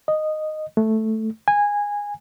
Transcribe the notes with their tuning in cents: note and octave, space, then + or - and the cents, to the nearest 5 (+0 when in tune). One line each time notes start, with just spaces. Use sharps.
D#5 -10
A3 +0
G#5 -15